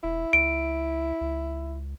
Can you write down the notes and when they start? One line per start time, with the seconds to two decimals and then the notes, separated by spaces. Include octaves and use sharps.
0.04 E1 E4
0.33 C#2 D7
1.21 C#2